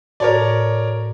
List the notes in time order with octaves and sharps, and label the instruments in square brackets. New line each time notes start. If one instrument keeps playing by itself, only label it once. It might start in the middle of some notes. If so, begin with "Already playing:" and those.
[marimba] A2 F#4 A5 [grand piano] A#4 C#5 D5